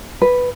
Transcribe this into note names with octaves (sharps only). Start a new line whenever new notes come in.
B4